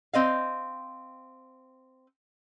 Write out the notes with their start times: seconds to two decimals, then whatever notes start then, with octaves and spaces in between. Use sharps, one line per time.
0.13 C4 D#5 F5